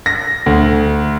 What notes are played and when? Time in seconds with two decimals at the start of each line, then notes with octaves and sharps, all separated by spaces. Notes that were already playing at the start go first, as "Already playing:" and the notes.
0.06 A#6
0.46 D2